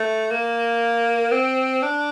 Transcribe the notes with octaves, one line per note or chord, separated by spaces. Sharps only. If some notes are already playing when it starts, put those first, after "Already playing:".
Already playing: A3
A#3
C4
D4